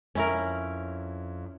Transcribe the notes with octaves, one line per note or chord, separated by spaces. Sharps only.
F2 C#4 E4 A#4